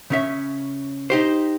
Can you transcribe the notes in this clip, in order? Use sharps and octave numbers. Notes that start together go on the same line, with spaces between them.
C#3 C#4 E5
D#4 G4 C5